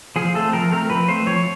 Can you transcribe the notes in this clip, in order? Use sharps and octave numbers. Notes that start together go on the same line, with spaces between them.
F3 G#4
A3 C4 A4
F3 A#4
A3 C4 A#4
F3 B4
A3 C4 C5
F3 C#5